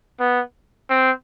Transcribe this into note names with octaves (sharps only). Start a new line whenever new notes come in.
B3
C4